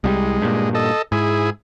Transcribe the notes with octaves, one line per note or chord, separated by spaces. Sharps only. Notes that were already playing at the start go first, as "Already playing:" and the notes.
C2 F3 G3 G#3
G2 A#2
A4 D#5
G#2 E4 G#4